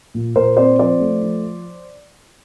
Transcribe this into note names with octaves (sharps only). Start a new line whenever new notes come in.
A#2
A#2 A#4 C5
C4 C5 D5
F3 C5 D5
A3
F3